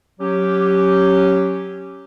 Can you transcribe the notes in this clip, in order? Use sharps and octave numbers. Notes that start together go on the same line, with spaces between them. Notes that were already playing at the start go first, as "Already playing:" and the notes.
F#3 C#4 G4